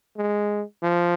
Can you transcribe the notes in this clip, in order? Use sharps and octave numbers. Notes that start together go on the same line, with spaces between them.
G#3
F3